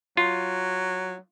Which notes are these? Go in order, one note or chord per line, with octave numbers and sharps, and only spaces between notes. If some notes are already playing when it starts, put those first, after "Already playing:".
F#3 F4